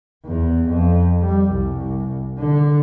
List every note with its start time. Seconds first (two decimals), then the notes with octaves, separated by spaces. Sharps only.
0.25 E2
0.67 F2
1.22 G3
1.51 C2
2.38 D3